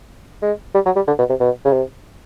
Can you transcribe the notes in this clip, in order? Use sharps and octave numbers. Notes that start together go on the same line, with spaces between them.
G#3
G3
F#3
G3
D3
B2
C3
B2
C#3
C3